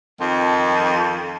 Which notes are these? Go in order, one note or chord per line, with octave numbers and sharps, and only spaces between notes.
F2 D#3 F3